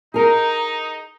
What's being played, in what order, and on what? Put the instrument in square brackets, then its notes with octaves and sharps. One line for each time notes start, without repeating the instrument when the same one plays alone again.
[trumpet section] D#4 [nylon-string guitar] G#4 A#4